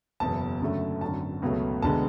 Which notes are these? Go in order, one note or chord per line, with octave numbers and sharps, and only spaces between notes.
F#1 E2 B2 A5
F#1 F#2 D3 A3
G#1 F#2 D3 A5
C#2 B2 F#3 A3
E1 E2 D3 G#3 A5